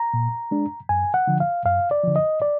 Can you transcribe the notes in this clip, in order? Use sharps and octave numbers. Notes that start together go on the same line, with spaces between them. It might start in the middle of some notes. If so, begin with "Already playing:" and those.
Already playing: A#5
A#2
G#3 D4
F#2 G#5
F#5
D3 F3
F5
F#2 F5
D5
D3 F3
D#5
D5